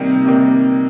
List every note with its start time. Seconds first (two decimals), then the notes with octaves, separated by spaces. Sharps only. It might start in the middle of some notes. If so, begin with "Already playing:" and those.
Already playing: C3 D#3 G3 A#3
0.25 C3 D#3 G3 A#3